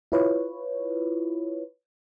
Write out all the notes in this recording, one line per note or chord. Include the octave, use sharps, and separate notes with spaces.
E4 F4 B4 C#5